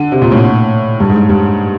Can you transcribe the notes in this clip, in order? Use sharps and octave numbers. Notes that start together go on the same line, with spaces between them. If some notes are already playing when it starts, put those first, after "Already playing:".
Already playing: D3
C3
A#2
A2
G2
G#2
G2